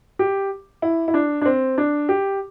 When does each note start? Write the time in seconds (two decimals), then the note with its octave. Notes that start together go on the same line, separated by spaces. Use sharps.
0.19 G4
0.82 E4
1.08 E4
1.14 D4
1.42 D4
1.46 C4
1.78 D4
2.09 G4